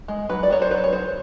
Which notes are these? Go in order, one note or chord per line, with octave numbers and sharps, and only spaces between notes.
G#3
F#3 B4
D5
F#3 C#5
C5
F#3 B4
C#5
F#3 C5